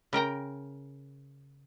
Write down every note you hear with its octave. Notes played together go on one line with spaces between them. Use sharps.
C#3 A#4 G5 A#5